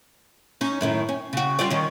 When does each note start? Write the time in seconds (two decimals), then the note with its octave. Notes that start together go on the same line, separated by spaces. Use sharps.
0.61 C#4 D#4
0.81 F#2 A2 D#3
1.09 C#4
1.33 C#3 F#4
1.59 G3 F4 D5
1.70 D#3 C#4